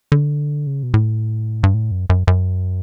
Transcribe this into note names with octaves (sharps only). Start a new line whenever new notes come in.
D3
C#3
B2
A2
G2
A2
F#2
F#2
F#2